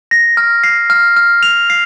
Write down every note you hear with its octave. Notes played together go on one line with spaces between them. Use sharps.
A#6
F6
C7
F6
F6
F7
C7